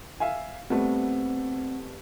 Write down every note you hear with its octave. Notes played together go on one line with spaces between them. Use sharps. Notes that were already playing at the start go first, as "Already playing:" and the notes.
E5 F5 G#5
G3 A3 B3 C4